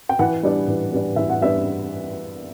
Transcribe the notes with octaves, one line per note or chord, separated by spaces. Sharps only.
G5
E3 F#5
G3 B3 D4
E3
G3 B3 D4
E3 E5
F#5
G3 B3 D4 E5